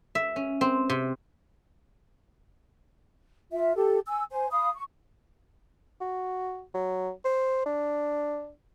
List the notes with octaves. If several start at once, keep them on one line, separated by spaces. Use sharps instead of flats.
E5
C#4
C4
C3
F4 E5
G4 A4
G#5 E6
C5 G#5
F5 B5 D#6
C#6
F#4
F#3
C5
D4